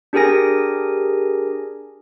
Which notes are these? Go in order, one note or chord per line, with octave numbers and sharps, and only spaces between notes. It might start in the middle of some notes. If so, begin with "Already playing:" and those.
D4 G4 G#4 A#4 G#5 A#6